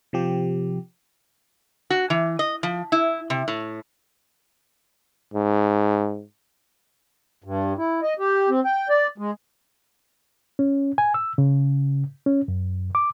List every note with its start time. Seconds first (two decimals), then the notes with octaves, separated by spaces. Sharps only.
0.13 C3 F3 G4
1.90 F#4
2.10 E3
2.39 D#5
2.63 F3
2.92 E4
3.30 C3
3.48 A2
5.34 G#2
7.44 G2
7.78 E4
8.02 D#5
8.19 G4
8.49 C4
8.65 G5
8.89 D5
9.18 G#3
10.59 C#4
10.98 G#5
11.14 E6
11.38 C#3
12.26 C#4
12.48 F#2
12.95 D6